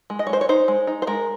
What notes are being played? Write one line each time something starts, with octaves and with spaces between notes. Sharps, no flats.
G#3
D#5
C#5
G#3 C5
C#5
D#4 C5
G#3
D#4
C5
G#3 A#4